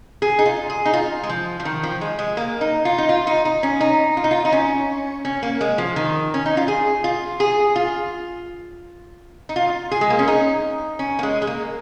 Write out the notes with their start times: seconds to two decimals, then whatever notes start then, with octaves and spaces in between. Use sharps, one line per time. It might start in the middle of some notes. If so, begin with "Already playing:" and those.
0.22 G#4
0.39 D#4
0.46 F4
0.70 G#4
0.85 D#4
0.93 F4
1.23 G#3
1.29 F3
1.60 F3
1.65 D#3
1.83 F3
2.01 G#3
2.19 G#3
2.37 A#3
2.61 D#4
2.85 F4
2.98 D#4
3.09 F4
3.27 D#4
3.45 D#4
3.63 C#4
3.81 D#4
4.17 F4
4.24 D#4
4.31 F4
4.45 D#4
4.52 C#4
5.25 C#4
5.43 A#3
5.61 G#3
5.78 F3
5.96 D#3
6.34 C#4
6.46 D#4
6.57 F4
6.68 G#4
7.04 F4
7.40 G#4
7.76 F4
9.49 D#4
9.56 F4
9.91 G#4
10.01 G#3
10.10 A#3
10.19 C#4
10.28 D#4
10.99 C#4
11.19 A#3
11.23 G#3
11.42 G#3
11.47 A#3